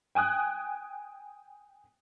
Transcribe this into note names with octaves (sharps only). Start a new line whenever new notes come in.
G5 G#5 D#6 F#6